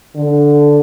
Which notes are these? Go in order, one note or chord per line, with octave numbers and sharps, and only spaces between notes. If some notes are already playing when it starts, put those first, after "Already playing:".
D3